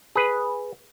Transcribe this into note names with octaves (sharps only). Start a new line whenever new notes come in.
G#4 B4